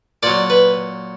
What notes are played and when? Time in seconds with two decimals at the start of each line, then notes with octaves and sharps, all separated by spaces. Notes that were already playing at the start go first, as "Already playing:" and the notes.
0.23 A#2 F#3 D5
0.50 B4